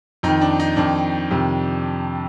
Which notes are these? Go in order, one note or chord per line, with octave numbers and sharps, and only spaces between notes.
F2 D#3 D#4
D4
D#4
F2 D#3 D4
F2 C3 D#3